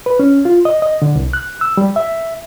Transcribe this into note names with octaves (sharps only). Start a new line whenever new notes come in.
B4
C#4
F4
D#5
D#5
D3
C2
F#6
E6
G3
E5